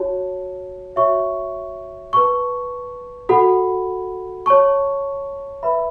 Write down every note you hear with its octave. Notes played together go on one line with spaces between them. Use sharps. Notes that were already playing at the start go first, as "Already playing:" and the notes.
Already playing: F#4 C#5 A5
F#4 C#5 E5 C#6
B4 A5 C#6
F#4 A4 F#5 B5
C#5 A5 C#6
B4 E5 B5